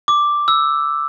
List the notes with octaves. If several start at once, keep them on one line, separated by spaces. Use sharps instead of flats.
D6
E6